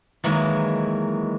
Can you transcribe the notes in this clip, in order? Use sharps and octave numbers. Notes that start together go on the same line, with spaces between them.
D#3 E3 F#3 G#3 A#3